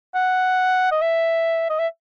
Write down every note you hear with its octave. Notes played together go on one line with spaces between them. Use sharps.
F#5
D#5
E5
D#5
E5